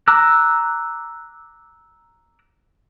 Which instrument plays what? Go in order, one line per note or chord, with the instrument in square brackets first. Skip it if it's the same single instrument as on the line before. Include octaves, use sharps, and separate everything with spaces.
[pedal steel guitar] A#5 D6 E6 F#6